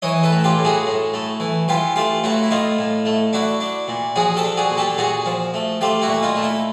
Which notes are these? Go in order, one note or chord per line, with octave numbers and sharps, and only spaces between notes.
E3 C#5 D#5
A4 B4
A2
F4 G4
A2
F#4 G#4
A2
A3
E3
E3 F4 G4
A3 F4 G4
A2 E4 F#4
E4
A2 D#4 F4
A2
A3
D4 E4 F#4
D4
A#2
F3 F#4 G#4
G4 A4
D4
F#4 G#4
A#2
G4 A4
A#2 F#4 G#4
F3
A3
A3 F4 G4
E4 F#4
A#2
D#4 F4
A3
E4